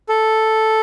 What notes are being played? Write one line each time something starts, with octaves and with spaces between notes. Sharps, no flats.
A4